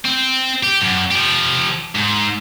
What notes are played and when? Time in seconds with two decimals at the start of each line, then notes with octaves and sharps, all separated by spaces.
0.05 C4
0.63 G4
0.81 F#2
1.11 F3 G4
1.95 G#2